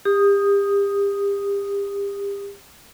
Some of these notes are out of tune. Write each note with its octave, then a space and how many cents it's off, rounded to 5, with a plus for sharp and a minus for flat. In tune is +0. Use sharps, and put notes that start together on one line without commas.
G4 +35 D#6 -5